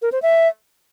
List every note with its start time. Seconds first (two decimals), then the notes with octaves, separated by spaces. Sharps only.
0.02 A#4
0.12 C5
0.22 E5